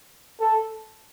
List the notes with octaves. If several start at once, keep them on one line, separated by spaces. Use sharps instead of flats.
A4